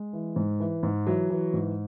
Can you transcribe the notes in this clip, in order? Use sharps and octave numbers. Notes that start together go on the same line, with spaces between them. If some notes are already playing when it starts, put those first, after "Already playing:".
Already playing: G#3
E3
G#2
E3
G#2
E3 F#3
E3
G#2